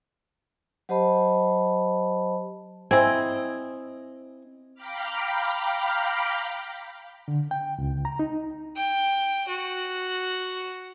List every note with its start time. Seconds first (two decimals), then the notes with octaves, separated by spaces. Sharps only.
0.89 F#3 G4 C5 D#5 A5 B5
2.91 C4 E4 D#5 G#5
4.74 F5 G5 A#5 B5 D6 F6
7.28 D3
7.51 G5
7.78 C#2
8.05 A#5
8.19 D#4
8.77 G5
9.49 F#4